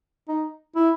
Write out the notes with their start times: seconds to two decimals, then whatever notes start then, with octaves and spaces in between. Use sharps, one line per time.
0.29 D#4
0.76 E4